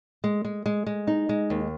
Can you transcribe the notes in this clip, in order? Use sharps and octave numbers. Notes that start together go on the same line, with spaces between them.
G#3
G#3
G#3
G#3
D#4
G#3
D#2